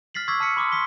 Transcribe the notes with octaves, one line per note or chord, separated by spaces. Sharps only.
F6 A6 B6 C7 F#7
C#6 D6 E6 G#6 A6 B6
A5 F6 B6 C#7
B5 C6 D6 D#6 F6
C6 D#6 B6 G7